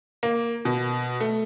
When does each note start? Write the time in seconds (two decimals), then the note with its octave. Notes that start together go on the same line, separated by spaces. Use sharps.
0.23 A#3
0.65 B2
1.20 A3